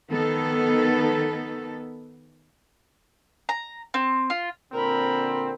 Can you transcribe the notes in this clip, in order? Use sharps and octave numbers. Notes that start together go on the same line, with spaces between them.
D#3 B3 A4
A#5
C4
F4
A#2 D3 C4 A#4 B5